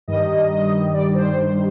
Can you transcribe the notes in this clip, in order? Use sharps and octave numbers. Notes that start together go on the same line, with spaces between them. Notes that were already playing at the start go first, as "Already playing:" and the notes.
G2 D#3 G3 D#5
D#5
D#5
D5
D5
C5